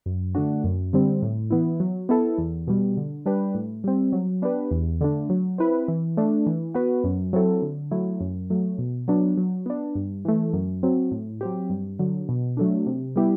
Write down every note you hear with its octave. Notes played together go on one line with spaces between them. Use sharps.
F#2
D3 A3 D4 F#4
F#2
D3 G3 C4
A2
E3 B3 E4
F#3
B3 E4 A4
E2
B2 G3
D3
G3 D4 G4 B4
A2
G3 C4
F#3
B3 D4 G4 B4
E2
D3 A3 D4
F#3
C4 E4 B4
E3
A3 D4
E3
B3 F#4 B4
F#2
F#3 C4 E4 A4
D3
F#3 A3 E4
F#2
F#3 A3
B2
F#3 B3 D4
F#3
B3 D4
G2
E3 A3
F#2
F#3 C4
A2
F#3 C4 G4
G2
D3 F#3
B2
F#3 A3 D4
C3
G3 B3 E4 G4